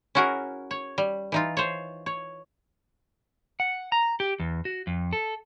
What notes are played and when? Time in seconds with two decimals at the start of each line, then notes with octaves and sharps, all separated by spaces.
0.15 C#4 E4 F#4 G#4 A#4
0.71 C#5
0.98 G3
1.32 E3 D#4 F4
1.57 C5 C#5
2.06 C#5
3.60 F#5
3.92 A#5
4.20 G4
4.40 E2
4.65 F#4
4.87 F2
5.13 A4